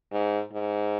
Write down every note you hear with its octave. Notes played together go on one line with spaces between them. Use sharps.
G#2
G#2